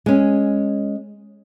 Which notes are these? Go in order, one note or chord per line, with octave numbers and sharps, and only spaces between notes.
G#3 C#4